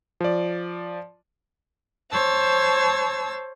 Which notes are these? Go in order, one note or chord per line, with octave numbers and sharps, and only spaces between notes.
F3 D5
C5 C#5 A5 E6